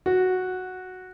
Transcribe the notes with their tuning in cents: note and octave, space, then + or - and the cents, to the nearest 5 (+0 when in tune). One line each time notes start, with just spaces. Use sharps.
F#4 -5